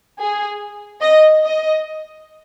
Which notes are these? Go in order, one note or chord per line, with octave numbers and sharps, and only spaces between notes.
G#4
D#5
D#5